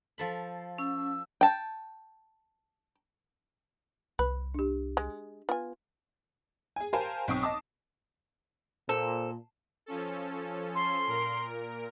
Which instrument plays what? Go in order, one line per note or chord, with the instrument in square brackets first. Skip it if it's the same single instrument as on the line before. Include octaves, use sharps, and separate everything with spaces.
[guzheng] F3 A4 B5
[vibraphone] C#4 [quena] E6
[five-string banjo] G5 A5
[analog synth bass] C2 [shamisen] B4
[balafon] D4 G4
[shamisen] G#3
[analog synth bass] B3 [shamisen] F4 G#5
[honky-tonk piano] G#4 G#5
G4 A#4 C5 F5 G#5 A5
B1 C4 G5 C#6 D#6 C7
D#5 A5 D6 D#6
[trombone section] A#2 [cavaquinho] A4 [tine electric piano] C5
[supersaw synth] F3 C#4 A4
[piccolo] C6
[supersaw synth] A#2 A#4 D7